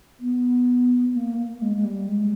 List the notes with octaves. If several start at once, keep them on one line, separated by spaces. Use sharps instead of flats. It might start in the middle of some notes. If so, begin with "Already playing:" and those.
B3
A#3
A#3
G#3
G#3
G3
G#3